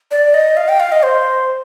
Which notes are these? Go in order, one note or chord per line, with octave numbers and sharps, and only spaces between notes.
D5
D#5
F5
G5
F5
D#5
C5